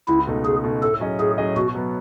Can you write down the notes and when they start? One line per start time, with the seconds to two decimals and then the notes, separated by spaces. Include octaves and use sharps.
0.08 C#2 E4
0.27 B2 A3 D#4
0.45 C#2 G#4
0.64 B2 A3 D#4
0.82 A2 A4
1.00 F#3 C#4 G#4 D#5
1.19 A2 G#4
1.38 F#3 C#4 G#4 D#5
1.56 B2 F#4
1.75 F#3 B3